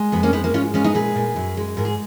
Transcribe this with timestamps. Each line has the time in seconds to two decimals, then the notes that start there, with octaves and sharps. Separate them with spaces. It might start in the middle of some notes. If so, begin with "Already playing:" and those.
Already playing: G#3
0.12 F2 B3
0.23 A#3 C#4
0.33 G#3 B3 D#4
0.44 A#3 C#4
0.54 G#2 C#4 F4
0.74 G#3 C#4 F4
0.84 B3 D#4
0.94 A#2 G#4 B4
1.16 A#2
1.36 F#2
1.57 G#3
1.77 G#2 A#4
1.85 G#4